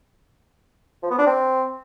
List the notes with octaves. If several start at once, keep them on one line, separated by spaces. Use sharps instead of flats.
F3
B3
D4
C4